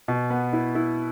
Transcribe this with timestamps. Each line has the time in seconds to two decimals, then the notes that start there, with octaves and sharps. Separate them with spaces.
0.08 B2
0.30 B3
0.53 E4
0.75 E4